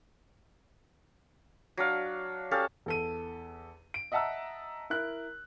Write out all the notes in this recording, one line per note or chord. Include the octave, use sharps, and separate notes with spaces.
F#3 D4 F5
C#4 G4 A4 F5
E2 A4 D#7
D7
D#5 E5 F#5 A5 A#5 E6
E4 A#4 F#6